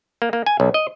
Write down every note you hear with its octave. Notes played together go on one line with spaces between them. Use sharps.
A#3
A#3
G#5
B1
D#5